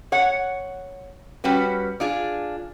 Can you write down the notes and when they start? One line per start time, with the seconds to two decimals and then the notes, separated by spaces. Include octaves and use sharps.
0.12 C#5 F#5
1.44 G3 C#4 F#4 B4
2.00 D4 F4 G#4